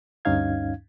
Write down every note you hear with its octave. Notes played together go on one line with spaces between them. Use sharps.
D2 G2 C#4 D#4 F5 G#6